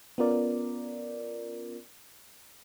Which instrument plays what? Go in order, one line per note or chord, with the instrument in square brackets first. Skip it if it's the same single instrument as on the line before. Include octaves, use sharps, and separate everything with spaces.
[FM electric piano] B3 C#4 F4 A#4 D5